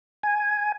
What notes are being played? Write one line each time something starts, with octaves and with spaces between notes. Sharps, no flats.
G#5